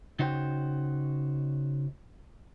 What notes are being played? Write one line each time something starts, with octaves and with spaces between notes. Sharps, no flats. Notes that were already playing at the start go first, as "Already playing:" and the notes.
C#3 D#4 F#4 C5 F#5 G5